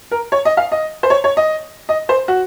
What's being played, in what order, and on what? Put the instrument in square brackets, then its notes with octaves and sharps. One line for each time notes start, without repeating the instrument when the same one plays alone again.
[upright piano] A#4
C#5
D#5
F5
D#5
C5
C#5
C#5
D#5
D#5
C5
F#4